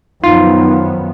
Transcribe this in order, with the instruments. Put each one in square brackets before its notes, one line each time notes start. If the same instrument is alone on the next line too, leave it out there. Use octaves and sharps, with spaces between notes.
[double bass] F#2 [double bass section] D#3 F3 B3 [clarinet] D#4 [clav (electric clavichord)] F4